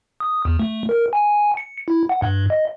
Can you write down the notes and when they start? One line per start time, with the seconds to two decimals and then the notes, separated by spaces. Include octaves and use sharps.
0.20 D#6
0.45 E2
0.59 A3
0.89 A#4
1.13 G#5
1.57 C#7
1.88 E4
2.09 F#5
2.22 G2
2.50 D#5